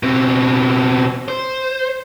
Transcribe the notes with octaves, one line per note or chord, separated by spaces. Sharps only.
B2 C4
C5